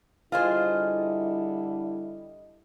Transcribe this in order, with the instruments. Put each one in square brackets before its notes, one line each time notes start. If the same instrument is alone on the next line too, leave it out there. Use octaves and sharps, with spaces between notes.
[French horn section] D3 G3 E4 [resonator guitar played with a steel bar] F4 G#4 C5 [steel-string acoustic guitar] D#5